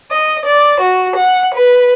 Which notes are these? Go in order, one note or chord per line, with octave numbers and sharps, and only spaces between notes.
D#5
D5
F#4
F#5
B4